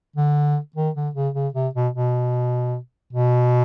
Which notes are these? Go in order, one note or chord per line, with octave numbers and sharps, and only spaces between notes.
D3
D#3
D3
C#3
C#3
C3
B2
B2
B2